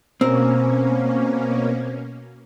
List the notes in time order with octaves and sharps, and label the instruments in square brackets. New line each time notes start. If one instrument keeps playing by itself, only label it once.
[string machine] B2 A#3 C#4 [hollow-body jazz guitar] C4 A#4